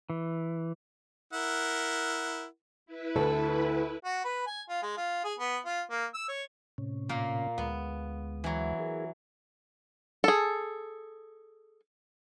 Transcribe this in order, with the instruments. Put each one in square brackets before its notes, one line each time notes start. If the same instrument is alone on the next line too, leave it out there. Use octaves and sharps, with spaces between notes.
[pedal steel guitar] E3
[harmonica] E4 A#4 F#5
[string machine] E4 B4
[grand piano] D2 [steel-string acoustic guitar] A4
[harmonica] F#4
B4
G#5
F4
G#3
F4
G#4
B3
F4
A#3
E6
C#5
[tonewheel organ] A2 C3 C#4
[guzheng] A#2 A#3
[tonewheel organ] D2 G#3 [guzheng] B3
[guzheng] E3 F#3
[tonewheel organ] E4 G#4 A#4
[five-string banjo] G#4 A4